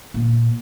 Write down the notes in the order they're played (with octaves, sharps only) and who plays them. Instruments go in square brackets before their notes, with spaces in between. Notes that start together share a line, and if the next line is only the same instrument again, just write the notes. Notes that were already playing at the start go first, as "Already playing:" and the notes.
[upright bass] A#2